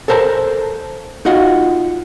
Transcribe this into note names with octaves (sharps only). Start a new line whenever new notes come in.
A4 A#4 C5 A5 A#5
D#4 F4 F#4 D#5 F#5